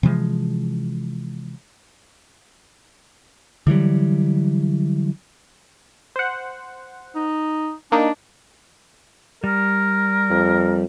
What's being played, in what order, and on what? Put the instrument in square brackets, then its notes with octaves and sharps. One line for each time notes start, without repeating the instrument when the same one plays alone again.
[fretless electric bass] C3 E3 F3 G#3
[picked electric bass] D3 E3 F#3 G3
[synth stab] C5 F#5
[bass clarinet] D#4
[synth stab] A#3 D#4 [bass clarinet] D4
[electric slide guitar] G3 [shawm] A#4
[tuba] F2